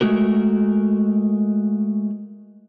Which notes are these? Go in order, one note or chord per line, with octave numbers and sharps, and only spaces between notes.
G#3 A3 F#4 A#4